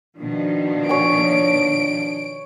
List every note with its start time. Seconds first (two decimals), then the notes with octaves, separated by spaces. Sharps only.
0.17 B2 D#3 F3 D4
0.89 C#5 G#5 D7